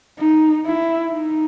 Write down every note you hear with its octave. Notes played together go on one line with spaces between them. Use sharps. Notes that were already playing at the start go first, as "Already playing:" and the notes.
D#4
E4
D#4